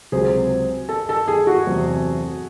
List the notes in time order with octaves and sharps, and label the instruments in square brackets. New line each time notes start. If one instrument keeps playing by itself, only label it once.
[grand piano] C#2 C3 F#3 C4 [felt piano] G#4
[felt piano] A4
A4
G#4
F#4
[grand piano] E2 C3 F#3 A3 C4